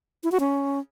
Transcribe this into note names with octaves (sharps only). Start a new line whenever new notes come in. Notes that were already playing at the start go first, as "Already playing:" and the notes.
E4
F#4
C#4